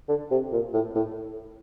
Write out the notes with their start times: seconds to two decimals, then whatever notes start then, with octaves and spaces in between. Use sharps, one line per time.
0.09 D3
0.31 C3
0.52 A#2
0.74 A2
0.95 A2